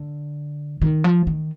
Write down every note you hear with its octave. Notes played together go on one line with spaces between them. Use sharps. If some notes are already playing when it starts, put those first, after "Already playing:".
Already playing: D3
D#3
F3
D#3